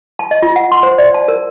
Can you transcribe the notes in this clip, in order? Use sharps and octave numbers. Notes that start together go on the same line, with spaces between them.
A5
D#5
F4
F#5
C6
C5
D5
A5
A#4